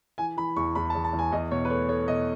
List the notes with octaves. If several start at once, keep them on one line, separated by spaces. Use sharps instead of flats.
E3 G#5
E3 B5
E2 C#6
E2 B5
A5
E2
A5
E2
G#5
E2 D#5
B2 C#5
B4
A3 C#5
A3 C#5
B2 D#5